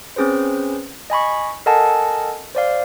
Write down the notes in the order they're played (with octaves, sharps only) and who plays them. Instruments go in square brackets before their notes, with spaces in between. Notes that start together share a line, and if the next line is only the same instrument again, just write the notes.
[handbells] C4 C#4 G#4 B4 C5
D#5 G#5 B5 C#6
A4 A#4 D#5 F#5 G#5 A5
C5 D5 F5